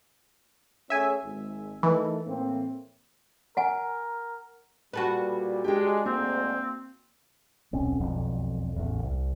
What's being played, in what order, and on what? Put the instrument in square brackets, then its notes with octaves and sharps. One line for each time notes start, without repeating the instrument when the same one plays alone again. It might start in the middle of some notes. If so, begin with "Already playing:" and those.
[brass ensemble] A3 C#4 G#4 [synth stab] E5 G#5
[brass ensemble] G#1
[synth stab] E3 [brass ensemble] A3 D#4 A#4
[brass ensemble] A2 A#3 C4
[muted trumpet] A#4 [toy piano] F#5 G#5
[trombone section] A#2 G3 [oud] F#4 A4 B4
[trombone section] G#3 D4 [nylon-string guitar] G4 G5
[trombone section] D2 G#2 [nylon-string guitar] A#3 [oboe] C4
[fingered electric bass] D#1 B1 C4 C#4
E1 B1 F2
A1 E2
C2